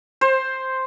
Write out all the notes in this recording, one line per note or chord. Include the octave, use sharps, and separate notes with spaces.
C5